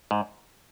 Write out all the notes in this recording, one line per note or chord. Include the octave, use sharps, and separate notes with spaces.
G#2